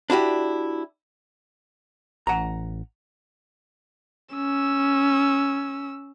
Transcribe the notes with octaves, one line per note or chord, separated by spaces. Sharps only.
D4 E4 F#4 G4
A1 F#5 A#5
C#4 E6